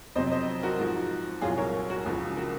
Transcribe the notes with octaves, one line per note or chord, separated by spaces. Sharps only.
F2 C3 F#3 C5 D#5
C5 D#5
F#4 A#4
G#2 F3
C2 A#2 F#3 F4 G#4
A#4 C#5
F#4 A#4
C#2 C#3 F3
F#4 A#4